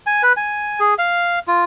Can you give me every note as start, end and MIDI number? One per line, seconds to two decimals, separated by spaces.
0.07 0.22 80
0.23 0.33 71
0.37 0.80 80
0.80 0.94 68
0.98 1.39 77
1.48 1.64 65